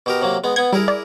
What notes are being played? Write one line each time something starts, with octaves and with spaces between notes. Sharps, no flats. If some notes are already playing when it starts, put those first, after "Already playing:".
B2 G4 A#4
C3 F#3 A#3
G#3 B3
B3 F#5 G#6
G3 E4 G#4 A#4
D5